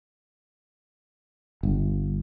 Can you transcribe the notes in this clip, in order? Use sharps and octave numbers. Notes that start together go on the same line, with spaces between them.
G1